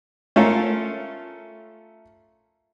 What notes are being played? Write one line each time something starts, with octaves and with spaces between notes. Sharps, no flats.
A3 C#4 F4 A4 A#4